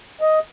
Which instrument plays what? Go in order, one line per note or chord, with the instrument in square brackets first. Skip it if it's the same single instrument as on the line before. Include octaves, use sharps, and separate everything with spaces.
[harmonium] D#5